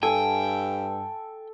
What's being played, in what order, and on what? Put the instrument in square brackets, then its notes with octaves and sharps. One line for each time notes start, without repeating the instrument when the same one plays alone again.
[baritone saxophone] G2 [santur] A4 [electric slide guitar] G5 [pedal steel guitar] G#5